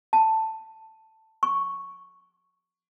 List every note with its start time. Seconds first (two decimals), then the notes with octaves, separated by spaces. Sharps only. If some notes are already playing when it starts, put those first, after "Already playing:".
0.13 A5
1.43 C#6